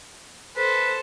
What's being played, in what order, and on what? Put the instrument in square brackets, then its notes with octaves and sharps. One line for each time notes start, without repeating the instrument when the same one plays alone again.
[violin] A4 C5 [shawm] B4